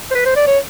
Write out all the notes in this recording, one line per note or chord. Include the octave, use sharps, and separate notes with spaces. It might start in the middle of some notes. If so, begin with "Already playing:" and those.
C5
B4
C5
D5
C#5